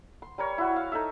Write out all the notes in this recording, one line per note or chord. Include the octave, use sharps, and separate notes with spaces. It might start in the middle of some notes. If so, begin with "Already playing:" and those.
C6
G3 A#4 C#5
E4 F#4
F5
D#4 A4 E5